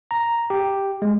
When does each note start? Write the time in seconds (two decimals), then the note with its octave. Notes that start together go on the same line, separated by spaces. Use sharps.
0.11 A#5
0.50 G4
1.02 G#3